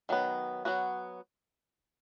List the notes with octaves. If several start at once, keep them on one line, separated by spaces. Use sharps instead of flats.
D#3 F#3 B3
F#3 B3 F#4